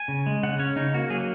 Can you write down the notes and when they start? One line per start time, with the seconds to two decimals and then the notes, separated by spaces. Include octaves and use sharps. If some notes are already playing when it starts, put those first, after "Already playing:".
Already playing: G#5
0.08 C#3
0.26 G#3
0.43 C#3 F#5
0.59 C#4 C#5
0.76 C#3 D#4
0.94 A#3 F#4
1.10 F#3 G#4